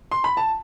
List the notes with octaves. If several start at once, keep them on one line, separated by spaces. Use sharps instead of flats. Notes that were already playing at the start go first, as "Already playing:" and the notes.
C6
B5
A5